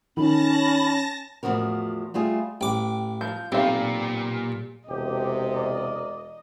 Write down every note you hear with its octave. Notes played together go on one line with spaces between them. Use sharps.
D#3 C#4 A5 B5 A#6
E2 A2 F3 F#4 A#4
G3 A3 F4 G#4
A1 G5 D6
F3 G6
B1 A#2 C4 G4 F5
E1 C3 G4 D#5
A#4 D5